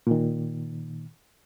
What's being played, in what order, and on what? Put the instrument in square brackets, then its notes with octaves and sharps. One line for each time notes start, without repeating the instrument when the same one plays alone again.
[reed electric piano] A#2 D#3